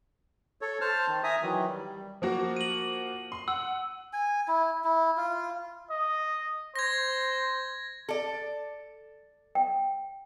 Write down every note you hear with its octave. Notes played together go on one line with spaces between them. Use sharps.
A4 C#5
C5 A5 F6
D#3
E5 G#5 A#5 D#6
D#3 E3 F#3
G3
F3 A#3 F#4
D#7 F#7
C6
F#5 E6
G#5
E4
E4
F4
D#5
C5 G#6 A#6
A4 D5
G5